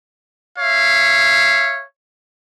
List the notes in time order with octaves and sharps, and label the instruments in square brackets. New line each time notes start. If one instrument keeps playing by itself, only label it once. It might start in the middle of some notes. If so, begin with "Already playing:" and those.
[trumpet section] C#5 E5 F5